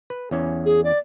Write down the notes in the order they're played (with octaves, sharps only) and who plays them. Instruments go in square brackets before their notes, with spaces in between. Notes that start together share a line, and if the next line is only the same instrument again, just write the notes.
[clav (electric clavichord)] B4
E2 C#4
[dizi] G#4
D5